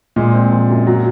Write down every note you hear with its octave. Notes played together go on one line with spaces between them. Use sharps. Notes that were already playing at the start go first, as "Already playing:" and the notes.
A#2 G#3
C4
F3
F#2
F#3